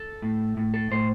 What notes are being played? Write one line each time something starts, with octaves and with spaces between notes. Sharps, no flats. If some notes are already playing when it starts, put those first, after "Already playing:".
Already playing: A4
A2
A2
A4
A2 C5